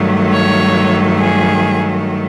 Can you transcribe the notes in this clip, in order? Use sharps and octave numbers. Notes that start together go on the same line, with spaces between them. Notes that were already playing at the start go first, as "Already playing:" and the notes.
Already playing: G2 D#3 F#3 A3
C#5
G#4